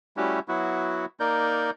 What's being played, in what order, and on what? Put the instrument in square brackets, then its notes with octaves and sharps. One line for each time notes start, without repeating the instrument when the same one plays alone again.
[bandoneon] G3 A3 C#4 E4 F#4 G4
F#3 B3 E4 F#4
A#3 D#4 A#4 D5 G6